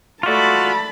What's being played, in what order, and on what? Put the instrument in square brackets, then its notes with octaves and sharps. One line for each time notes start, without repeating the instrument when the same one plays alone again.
[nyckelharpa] A3 D5 [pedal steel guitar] F4 F#4 [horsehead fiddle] A5 B5